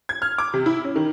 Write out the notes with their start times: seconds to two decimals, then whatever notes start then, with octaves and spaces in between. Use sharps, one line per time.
0.09 G#6
0.22 F6
0.38 D6
0.54 C3
0.66 E4
0.84 C#4
0.95 D#3